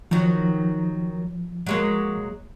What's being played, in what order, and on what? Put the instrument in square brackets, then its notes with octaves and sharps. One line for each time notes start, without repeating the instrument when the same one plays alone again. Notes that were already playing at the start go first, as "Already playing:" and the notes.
[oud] D#3 F#3 [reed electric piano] F3
[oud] F#3 G#3 A#3